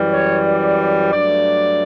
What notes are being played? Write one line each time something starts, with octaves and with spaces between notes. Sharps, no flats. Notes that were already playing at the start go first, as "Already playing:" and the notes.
Already playing: F#2 E3 G3
C#5
D5
G2 F#3 A3 D5